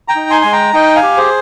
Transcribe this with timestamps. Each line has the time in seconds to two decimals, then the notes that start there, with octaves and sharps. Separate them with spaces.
0.08 G5 A#5
0.16 D#4
0.30 G#5 C6
0.41 G#3 G#5
0.52 G5 A#5
0.74 D#4 D#5 G5
0.96 F5 G#5
1.02 G4
1.17 G#4 C5